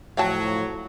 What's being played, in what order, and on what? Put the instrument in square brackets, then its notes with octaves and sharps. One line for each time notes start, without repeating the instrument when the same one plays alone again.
[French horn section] A2 F3 [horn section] F#3 [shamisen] F5 G5 A5